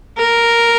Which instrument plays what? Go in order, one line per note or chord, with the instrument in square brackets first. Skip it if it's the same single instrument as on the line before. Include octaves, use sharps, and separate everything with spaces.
[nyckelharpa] A#4